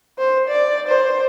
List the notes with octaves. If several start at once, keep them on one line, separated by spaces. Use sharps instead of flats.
C5
D5
C5